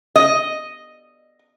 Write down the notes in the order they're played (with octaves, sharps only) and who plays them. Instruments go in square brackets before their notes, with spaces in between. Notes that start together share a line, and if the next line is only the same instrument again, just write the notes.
[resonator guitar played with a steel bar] D#5